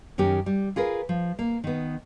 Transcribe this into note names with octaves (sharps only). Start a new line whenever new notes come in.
F#2 D#3 C#4 G4
G3
F4 G#4 A#4 B4
F3
A#3
D#3 B3